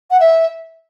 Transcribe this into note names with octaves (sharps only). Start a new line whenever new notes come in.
F#5
E5